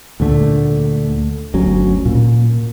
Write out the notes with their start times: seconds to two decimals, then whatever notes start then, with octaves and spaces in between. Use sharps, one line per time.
0.20 D2 A#2 D3 A3
1.54 G1 D2 F#3 C#4
2.05 A#2